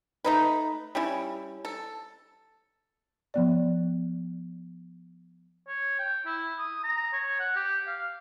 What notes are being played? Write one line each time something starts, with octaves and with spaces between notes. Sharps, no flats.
A3 D#4 B4
G3 C#4 E4
A4
F3 B3 D5
C#5
G5
E4
D#6
A#5
C#5
F#5
G4
F5